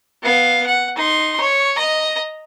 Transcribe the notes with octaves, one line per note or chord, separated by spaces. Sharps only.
B3 F5
F#5
D#4 C6
C#5
D#5 A#5